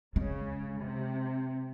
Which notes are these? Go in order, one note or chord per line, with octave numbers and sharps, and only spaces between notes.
C#3 G#3
C3